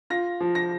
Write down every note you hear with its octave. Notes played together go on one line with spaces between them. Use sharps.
F4 A#6
F3
A#6